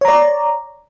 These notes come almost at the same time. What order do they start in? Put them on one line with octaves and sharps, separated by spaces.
C#5 A#5 D5